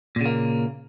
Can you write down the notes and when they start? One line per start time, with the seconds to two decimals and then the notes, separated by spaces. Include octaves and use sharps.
0.16 A#2
0.21 C#3
0.25 A#3